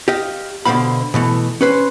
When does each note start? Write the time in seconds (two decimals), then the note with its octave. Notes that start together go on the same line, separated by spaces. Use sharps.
0.08 G4 D#5 F5
0.65 B2 D3 F3 C5 F5 B5
1.14 B2 E3 A3
1.61 C#4 B4 C5